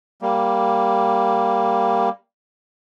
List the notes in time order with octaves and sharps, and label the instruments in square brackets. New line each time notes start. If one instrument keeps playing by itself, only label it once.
[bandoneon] G3 A#3